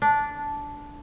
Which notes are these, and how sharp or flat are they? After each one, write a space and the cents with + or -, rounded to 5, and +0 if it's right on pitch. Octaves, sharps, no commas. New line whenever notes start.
D4 -10